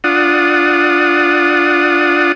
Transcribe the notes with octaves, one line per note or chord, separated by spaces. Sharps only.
D4 F4 F#5 D#6